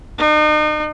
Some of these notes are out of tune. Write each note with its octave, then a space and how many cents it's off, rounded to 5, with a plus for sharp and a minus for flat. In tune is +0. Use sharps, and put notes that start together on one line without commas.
D#4 -40